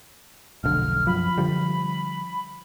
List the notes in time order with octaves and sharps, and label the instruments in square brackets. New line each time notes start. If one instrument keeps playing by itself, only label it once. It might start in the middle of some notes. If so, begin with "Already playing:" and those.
[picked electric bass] F1 B1 D3 [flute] F6
[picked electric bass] F#2 F3 [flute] B5
[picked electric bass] D3 F3 G3